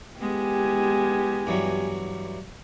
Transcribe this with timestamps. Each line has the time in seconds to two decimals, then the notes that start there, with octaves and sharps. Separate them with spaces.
0.20 G#3 B3 G4 G#5
1.47 G2 E3 F#3